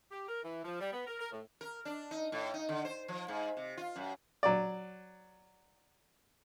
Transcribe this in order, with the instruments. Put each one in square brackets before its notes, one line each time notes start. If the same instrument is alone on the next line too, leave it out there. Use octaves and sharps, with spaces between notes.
[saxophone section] G4
A#4
E3
F3
G3
B3
A#4
A#4
A2
[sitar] A#4
D4
D#4
A2
D#4
D3
C5
F3
G#2
C3
F4
F#2
[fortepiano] F#3 D5